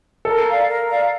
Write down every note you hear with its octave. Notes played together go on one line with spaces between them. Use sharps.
A4 A#4
D5 F5 A#5
A#4
D5 F5 A#5